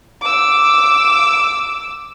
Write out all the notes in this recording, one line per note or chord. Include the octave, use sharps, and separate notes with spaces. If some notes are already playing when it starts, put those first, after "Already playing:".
D6 E6